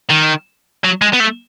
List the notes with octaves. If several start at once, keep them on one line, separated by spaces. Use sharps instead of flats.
D#3
F#3
G#3
B3
A3